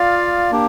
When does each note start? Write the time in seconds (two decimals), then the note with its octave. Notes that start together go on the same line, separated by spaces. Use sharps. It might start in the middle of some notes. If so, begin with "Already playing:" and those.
Already playing: F4 D5 F5
0.51 A#3 D4 G4